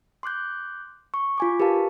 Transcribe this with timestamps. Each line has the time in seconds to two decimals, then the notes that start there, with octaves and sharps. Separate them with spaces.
0.23 C6 D6 F#6 G6
1.14 C#6
1.38 F4 G#5 D6
1.60 G4 A#4 B4 F5 A5